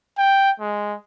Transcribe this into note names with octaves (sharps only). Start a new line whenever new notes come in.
G5
G#3